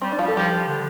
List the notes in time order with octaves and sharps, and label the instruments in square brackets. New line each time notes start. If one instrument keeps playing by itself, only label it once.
[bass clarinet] G3 [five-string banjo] C4
[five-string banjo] D4
[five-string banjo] F3 F4 [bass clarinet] G3
[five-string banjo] A4
[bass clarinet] F3 [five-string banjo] G3 G4
[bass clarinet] F3
D3